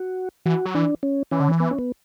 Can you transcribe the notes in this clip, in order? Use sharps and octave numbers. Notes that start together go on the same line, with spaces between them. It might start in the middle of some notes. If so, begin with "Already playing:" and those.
Already playing: F#4
E3 F#4
F#3
E3 D4
C#4
E3 C#4
D3
E3
B3
C#4
B3